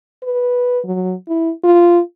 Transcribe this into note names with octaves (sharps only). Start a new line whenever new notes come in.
B4
F#3
E4
F4